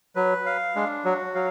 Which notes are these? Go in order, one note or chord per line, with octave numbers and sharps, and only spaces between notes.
F#3 B4
F5
G#3 D4
F#3 F#4
F#3 F5